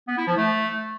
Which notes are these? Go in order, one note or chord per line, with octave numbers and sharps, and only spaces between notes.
B3
E4
F3
A3